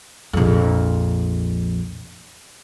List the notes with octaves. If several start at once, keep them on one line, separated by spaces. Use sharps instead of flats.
A#1 F2